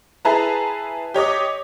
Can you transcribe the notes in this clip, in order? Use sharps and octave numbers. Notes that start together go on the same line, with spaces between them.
E4 G#4 B4 A5 A#5
G4 C#5 D#5 D6